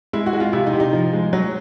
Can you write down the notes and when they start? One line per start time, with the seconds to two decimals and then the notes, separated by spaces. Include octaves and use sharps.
0.13 G#3 E4
0.26 F#4
0.33 G#3
0.40 F4
0.53 C3 E4
0.67 D#4
0.73 C3
0.80 D#4
0.93 F3
1.13 G#3
1.33 F#3